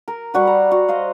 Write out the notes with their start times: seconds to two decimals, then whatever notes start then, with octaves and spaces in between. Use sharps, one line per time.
0.08 A#4
0.34 G3 F#4 B4
0.47 A#5
0.72 F#4
0.88 C5 D#5 F5